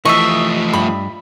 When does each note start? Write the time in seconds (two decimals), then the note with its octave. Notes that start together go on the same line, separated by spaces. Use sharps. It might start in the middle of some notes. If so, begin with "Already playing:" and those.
0.05 E3 F3 A3 D#5 E5 C#6
0.73 G2 B5